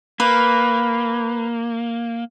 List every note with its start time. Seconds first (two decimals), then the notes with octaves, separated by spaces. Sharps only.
0.20 A#3 B4